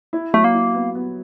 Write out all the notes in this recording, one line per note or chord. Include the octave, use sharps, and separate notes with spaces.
E4
F#3 A3
A#3
E4
B3
B3